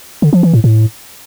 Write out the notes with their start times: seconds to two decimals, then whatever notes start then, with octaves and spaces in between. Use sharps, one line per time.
0.22 D3
0.33 F3
0.43 E3
0.53 A2
0.64 A2